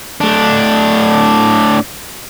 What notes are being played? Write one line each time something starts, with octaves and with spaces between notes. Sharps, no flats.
A2 D4